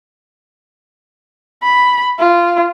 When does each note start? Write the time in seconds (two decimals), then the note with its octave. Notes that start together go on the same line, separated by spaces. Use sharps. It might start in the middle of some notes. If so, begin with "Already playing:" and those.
1.63 B5
2.19 F4